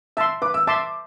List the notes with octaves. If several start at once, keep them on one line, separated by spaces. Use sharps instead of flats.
E5 A5 C6 E6
B4 D6
E6
E5 A5 C6 D6